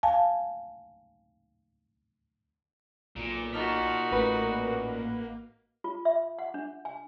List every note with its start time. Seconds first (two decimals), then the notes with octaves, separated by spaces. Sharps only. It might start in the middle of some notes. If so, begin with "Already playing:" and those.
0.03 F5 G#5 A5
3.16 B1 A#2
3.53 D#4 F#4 A5 F6 B6
4.11 A1 A#3 B4 F#5
5.84 F4
6.05 E5
6.39 F#5
6.54 D4
6.85 G#5